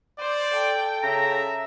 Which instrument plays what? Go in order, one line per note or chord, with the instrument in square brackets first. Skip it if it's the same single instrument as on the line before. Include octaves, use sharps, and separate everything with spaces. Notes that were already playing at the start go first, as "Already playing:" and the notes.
[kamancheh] C5 [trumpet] D5
[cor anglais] A4 [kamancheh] G5
[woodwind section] C#3 A#5 [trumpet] E5